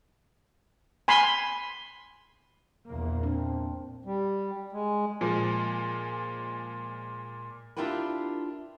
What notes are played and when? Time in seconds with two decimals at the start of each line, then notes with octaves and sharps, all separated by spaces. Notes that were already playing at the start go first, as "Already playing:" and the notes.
1.08 G#5 B5 C6
2.87 A#1 E2 A#3
3.23 C4 D4
4.05 G3
4.73 G#3
5.21 A#2 F3 G#3
7.77 D4 E4 F4 G4 A#4 B4